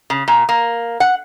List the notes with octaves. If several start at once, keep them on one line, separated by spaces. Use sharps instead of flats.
C#3
A#2
A#3
F#5